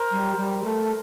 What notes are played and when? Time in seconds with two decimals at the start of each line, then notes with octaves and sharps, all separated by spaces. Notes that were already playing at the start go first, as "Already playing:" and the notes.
Already playing: A#4 C5
0.11 G3
0.37 G3
0.64 A3